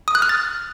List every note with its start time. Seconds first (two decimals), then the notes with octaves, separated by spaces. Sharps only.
0.08 D#6
0.15 F#6
0.22 F6
0.29 A6